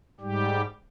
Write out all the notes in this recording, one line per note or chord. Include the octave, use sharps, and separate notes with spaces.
G#2 G3 G4